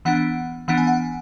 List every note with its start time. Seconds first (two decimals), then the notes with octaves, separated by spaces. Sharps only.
0.05 E3 B3 D4 F#5
0.68 E3 B3 D4 F#5
0.77 G#5
0.87 F#5